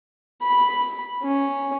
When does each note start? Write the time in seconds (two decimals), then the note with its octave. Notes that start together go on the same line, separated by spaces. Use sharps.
0.43 B5
1.23 C#4